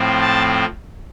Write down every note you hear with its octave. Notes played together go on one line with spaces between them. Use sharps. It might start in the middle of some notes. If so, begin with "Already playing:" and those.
Already playing: A2 F3 C4
A5